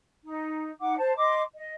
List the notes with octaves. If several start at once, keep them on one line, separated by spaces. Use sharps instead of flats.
D#4
D#4 F#5 D6
C5 A5
D#5 C6 D6
D#5